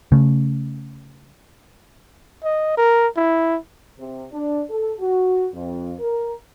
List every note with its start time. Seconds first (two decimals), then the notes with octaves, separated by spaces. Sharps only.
0.12 C#3 A3
2.44 D#5
2.77 A#4
3.17 E4
3.96 C3
4.31 D4
4.68 A4
4.99 F#4
5.53 F2
5.99 A#4